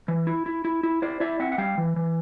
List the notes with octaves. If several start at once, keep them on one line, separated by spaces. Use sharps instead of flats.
E3
E4
E4
E4
E4
E4 C5 D5
E4 D5 E5
C4 E5 F#5
F#5
G3 F5 G5
E3
E3